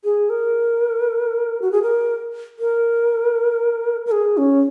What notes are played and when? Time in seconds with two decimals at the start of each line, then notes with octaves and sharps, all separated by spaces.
0.04 G#4
0.30 A#4
1.62 F#4
1.72 G#4
1.82 A#4
2.59 A#4
4.06 A#4
4.12 G#4
4.37 C#4